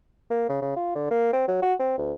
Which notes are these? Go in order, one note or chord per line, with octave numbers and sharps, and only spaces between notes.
A#3
C#3
C#3
F4
D3
A#3
C4
F#3
F#4
C4
D2